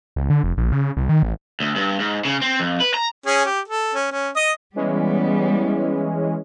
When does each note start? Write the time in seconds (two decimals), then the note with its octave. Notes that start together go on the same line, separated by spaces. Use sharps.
0.16 C#2
0.30 D3
0.44 F1
0.57 A#1
0.72 C#3
0.97 C2
1.09 D#3
1.23 A1
1.60 D2
1.76 G2
2.00 G#2
2.25 C#3
2.41 C4
2.60 F2
2.80 B4
2.94 A#5
3.26 C#4 G#4
3.45 G4
3.68 A4
3.94 C#4
4.12 C#4
4.36 D#5 D#6
4.76 E3 G3 G#3 B3 C#4